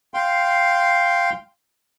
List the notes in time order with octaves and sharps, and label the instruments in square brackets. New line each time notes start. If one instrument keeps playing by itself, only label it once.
[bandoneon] F5 G5 C6